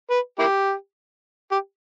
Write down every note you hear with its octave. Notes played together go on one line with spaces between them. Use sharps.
B4
A#3 E4 G4
G4